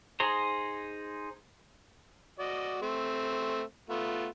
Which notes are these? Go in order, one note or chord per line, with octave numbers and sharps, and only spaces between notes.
D#4 G#4 C5 A#5
F#4 D5 D#5
A3 C4
A3 B3 F4